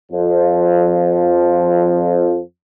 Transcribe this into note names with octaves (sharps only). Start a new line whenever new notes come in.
F2 F3